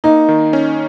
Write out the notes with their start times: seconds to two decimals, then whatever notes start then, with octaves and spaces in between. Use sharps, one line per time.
0.04 A#3 D#4
0.29 D#3
0.53 C#4